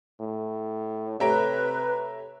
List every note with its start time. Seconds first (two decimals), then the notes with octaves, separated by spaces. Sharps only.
0.20 A2
1.20 C3 A3 G4 B4 C#5 E5 A#5 D7